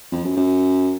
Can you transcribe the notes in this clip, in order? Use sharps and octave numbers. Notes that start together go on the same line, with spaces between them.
F2
F#2
F#2